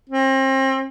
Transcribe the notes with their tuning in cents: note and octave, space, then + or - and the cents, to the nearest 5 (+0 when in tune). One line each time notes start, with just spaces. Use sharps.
C4 +35